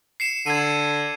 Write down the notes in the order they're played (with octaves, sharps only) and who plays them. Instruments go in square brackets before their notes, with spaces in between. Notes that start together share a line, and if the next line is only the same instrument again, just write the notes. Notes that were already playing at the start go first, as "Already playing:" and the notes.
[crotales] C7 C#7 E7
[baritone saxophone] D3 [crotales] G#6 D#7